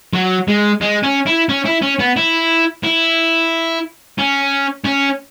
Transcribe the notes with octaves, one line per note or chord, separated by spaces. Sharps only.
F#3
G#3
G#3
C#4
E4
C#4
E4
C#4
B3
E4
E4
C#4
C#4